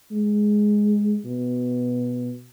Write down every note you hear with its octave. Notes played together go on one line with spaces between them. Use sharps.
G#3
B2